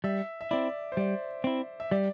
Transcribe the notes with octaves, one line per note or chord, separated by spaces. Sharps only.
G3 E5
E5
C4 E4 D5
C5
G3 D5
C4 E4
E5
G3 D5